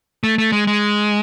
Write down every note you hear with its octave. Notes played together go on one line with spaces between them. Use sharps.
A3
A3
G#3
G#3